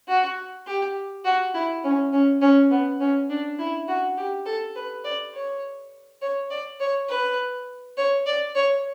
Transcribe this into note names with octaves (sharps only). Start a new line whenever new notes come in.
F#4
G4
F#4
E4
C#4
C#4
C#4
B3
C#4
D4
E4
F#4
G4
A4
B4
D5
C#5
C#5
D5
C#5
B4
C#5
D5
C#5